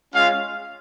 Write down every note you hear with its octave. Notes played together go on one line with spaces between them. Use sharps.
G#3 C#4 F4 F5